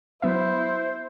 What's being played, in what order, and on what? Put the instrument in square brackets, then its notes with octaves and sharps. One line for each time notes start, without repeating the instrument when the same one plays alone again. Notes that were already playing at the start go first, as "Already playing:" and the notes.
[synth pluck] F#3 B3 E5 [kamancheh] E4 [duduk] C5